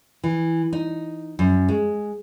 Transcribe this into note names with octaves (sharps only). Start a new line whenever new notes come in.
E3
D#4
F#2
G#3